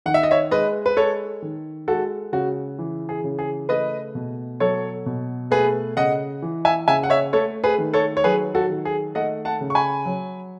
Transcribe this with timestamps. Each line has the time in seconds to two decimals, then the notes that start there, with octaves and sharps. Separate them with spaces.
0.06 D#3 F#5
0.14 E5
0.23 D#5
0.31 C#5 E5
0.51 G#3 B4 D#5
0.86 B4
0.96 G#3 A4 C#5
1.42 D#3
1.88 G#3 F#4 A4
2.32 C#3 F#4
2.79 E3
3.09 G#4
3.24 C#3
3.39 G#4
3.69 A3 B4 D#5
4.15 B2
4.60 F#3 A4 C#5
5.06 B2
5.51 A3 G#4 B4
5.97 C#3 D#5 F#5
6.42 E3
6.65 E5 G#5
6.88 C#3 E5 G#5
7.03 F#5
7.10 C#5 E5
7.33 A3 A4 C#5
7.64 G#4 B4
7.78 D#3
7.94 A4 C#5
8.17 C#5
8.24 F#3 G#4 B4
8.55 F#4 A4
8.70 D#3
8.85 G#4
9.15 A3 D#5 F#5
9.45 F#5 A5
9.61 C#3
9.70 C#6
9.75 G#5 B5
10.06 F#3